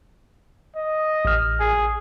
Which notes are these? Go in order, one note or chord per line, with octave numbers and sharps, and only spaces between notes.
D#5
A1 F6
G#4